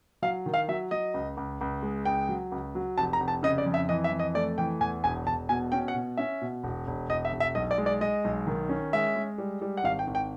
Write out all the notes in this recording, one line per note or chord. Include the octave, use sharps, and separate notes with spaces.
F#3 F5
D#3
F5
F#3 E5
F#3 D#5
C#2
C#2
C#2
G#3
C#2 G5
F#3
C#2
F#3
F1 A5
A#5
F1
A5
C#3 D#5
D5
F2
E5
E3 D#5
E5
F2
D#5
A3 D5
E3 G5
E2 G#5
E1 G#5
E1 A5
B2 G#5
C#4 G5
F#5
B2
C#4 E5
B2
E1
E1
E1 D#5
E5
E1
E5
B1 D#5
D5
G#3
D5
G#3 D#5
B1
D#3
C#4
G#3 E5
G#3
G3
G3
F#5
G#1 F5
G5
G#1
G5